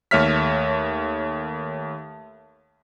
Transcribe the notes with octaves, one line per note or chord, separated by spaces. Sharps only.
D#2 A3 C#5 E5 F6 B6